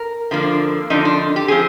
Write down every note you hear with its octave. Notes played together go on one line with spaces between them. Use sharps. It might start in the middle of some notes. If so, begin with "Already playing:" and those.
Already playing: A#4
F2 D3 F3 A#3 D4
F2 D3 F3 D4 D#4
D4
G4
F3 C4 G#4